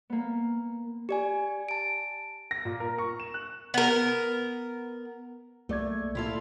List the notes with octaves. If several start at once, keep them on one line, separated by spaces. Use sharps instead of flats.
A#3 B3
G4 D5 G#5
A5 D7
A#6
A#2
A#4
C#6
E7
F#6
B3 A#4
C2 A3 A#3 D5 G#6
A2 E4 F4 A4